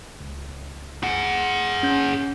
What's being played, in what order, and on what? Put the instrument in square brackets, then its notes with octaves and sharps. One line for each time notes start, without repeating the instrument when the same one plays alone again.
[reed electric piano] C#2
[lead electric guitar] G#4 F#5
[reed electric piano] C#4 G6